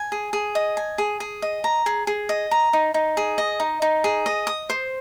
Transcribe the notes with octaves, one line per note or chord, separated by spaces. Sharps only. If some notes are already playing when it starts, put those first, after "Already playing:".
Already playing: G#5
G#4
G#4
D#5
G#5
G#4
G#4
D#5
A#5
G#4
G#4
D#5
A#5
D#4
D#4
G#4
D#5
D#4
D#4
G#4
D#5
D#6
C5